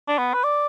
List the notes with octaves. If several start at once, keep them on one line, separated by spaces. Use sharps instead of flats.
D4
B3
B4
D5